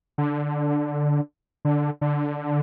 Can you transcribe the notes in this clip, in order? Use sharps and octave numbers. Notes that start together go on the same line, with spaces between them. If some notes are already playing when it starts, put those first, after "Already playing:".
D3
D3
D3